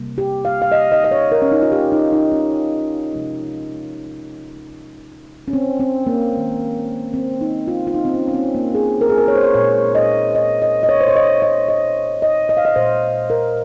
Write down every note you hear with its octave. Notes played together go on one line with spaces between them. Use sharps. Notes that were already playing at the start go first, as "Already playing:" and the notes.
Already playing: C3 G3 A#3
G4
F5
F5
D#5
D#5
D#5
C#5
A#4
C#4
D#4
F4
G4
D#4
D#4
C#4
C3 F3 G#3
C#4
C4
C4
A#3
D#3 G#3
C4
D#4
F4
F4
D#4
C4
C#4
C#4
C4
A#3
G#4
A#4
G#4
A#4
C#5
C5
C#5
A#2 G#3 C#5
D#5
D#5
D#5
D#5
C#5
C5
C#5
D#5
D#5
D#5
D#5
D#5
F5
D#5
A#2 G#3 C5
A#4